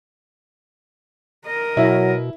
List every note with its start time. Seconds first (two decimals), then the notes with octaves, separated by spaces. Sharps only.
1.46 A#4 D#5
1.77 B2 F#3 E4